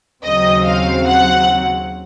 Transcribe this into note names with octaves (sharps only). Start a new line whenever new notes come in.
D#2 C#3 F#3 C4 D#5
F5
F#5